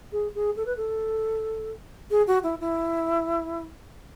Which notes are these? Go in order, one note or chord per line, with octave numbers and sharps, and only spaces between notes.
G#4
G#4
A4
B4
A4
G#4
F#4
E4
E4